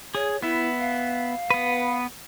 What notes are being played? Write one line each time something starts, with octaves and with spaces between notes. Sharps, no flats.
G#4 C#5
B3 E4 E5
F5
B3 B4